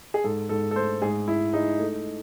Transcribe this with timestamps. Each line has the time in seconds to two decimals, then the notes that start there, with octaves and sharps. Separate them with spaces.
0.14 G#4
0.24 G#2 A4
0.49 G#2 A4
0.71 A4
0.76 A3 C5
1.02 G#2 G#4
1.28 G#2 E4
1.53 G#3 D#4
1.79 A3